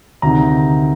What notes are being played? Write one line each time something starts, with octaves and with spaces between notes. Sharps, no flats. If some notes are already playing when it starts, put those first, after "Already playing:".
D2 C3 D#3 A#5